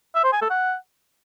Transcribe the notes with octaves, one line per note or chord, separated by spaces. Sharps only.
E5
C5
G#5
A4
F#5